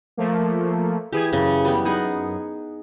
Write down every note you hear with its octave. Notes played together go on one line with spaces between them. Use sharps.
F3 A3 A#3
E3 G4 G#4 D#6 G#6
F#2 C#3 C#6
G3 B3 G5
D#4 G#4 F#5